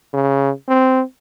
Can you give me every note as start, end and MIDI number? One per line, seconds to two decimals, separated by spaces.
0.13 0.50 49
0.68 1.01 60